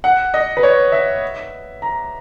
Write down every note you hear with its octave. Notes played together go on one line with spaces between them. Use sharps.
F#5
D#5
B4
C#5
E5
A#5